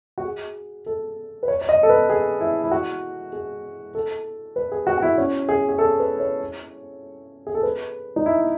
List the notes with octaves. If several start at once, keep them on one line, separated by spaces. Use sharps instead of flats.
F#4
G#4
A4
B4
C#5
C#5
D#5
A4
B4
G#4
E4
E4
F#4
G#4
A4
B4
G#4
F#4
F#4
E4
C#4
G#4
G#4
A4
B4
C#5
G#4
A4
B4
D#4
E4